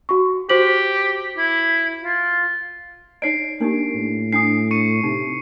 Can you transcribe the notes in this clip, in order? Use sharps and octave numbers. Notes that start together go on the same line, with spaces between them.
F#4 C#6
F#4 G4 C5 F#7
E4
F4
D#4 C#5 D5 C7 D7
A#3 D4 D#4 G4
A2
D4 G#5 D#6 C7
C#6 C#7 D#7
C3 D#4